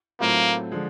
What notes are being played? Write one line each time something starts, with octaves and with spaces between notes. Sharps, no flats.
A2 F#3 A3 A#3 C4 F4
D3 F3 G#3